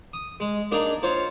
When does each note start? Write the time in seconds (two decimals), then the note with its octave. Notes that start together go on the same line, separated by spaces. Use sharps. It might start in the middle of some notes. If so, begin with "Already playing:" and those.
0.13 D#6
0.40 G#3
0.71 A#3 D4 D#4 G#4
1.03 F4 C5 C#5